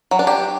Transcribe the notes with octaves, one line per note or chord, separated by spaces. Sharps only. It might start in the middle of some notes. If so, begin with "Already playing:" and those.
F#3
D4
G4